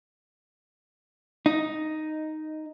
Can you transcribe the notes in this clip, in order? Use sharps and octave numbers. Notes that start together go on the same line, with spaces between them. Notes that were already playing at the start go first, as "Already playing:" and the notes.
D#4